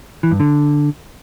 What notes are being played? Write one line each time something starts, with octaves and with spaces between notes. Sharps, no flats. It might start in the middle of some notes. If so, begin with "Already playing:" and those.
E3
G2
D3